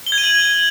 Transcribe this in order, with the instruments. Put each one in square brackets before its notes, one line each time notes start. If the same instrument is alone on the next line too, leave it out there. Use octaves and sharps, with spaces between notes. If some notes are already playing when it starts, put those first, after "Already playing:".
[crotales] G7
G#6
D#7
F#7
D#7